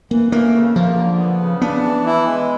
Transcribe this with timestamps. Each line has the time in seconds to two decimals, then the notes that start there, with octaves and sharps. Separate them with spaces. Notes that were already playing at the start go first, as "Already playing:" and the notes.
0.11 E3 A#3
0.32 A3 A#3
0.54 C#3
0.76 F3 A#3
0.98 D3
1.19 B3
1.40 C#3
1.61 B3 D4
1.83 E3
2.06 E4
2.27 G#3